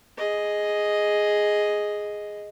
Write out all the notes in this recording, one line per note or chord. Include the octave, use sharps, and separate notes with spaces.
G#4 D#5